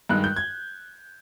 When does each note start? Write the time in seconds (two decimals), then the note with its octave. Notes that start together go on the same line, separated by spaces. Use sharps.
0.09 G2 D#3 G#3 F#6
0.24 G6
0.36 G#6